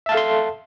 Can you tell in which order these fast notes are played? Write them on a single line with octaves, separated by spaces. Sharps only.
E5 A5 F5 A4 C6